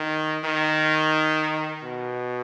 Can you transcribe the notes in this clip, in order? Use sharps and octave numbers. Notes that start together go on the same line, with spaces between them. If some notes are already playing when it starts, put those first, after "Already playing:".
Already playing: D#3
D#3
B2